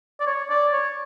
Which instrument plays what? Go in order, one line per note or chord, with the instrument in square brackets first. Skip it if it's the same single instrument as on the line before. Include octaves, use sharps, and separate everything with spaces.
[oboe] D5
C#5
D5
C#5